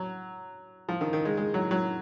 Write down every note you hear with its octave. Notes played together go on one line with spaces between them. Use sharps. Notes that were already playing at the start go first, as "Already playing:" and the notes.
Already playing: F#3
F3
D#3
D#3
G#3
G#3
F#3
F#3